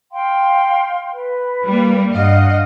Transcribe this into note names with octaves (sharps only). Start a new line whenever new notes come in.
F5 G5 C6
B4
G3 A#3
G2 D#5 F5 F#5 F6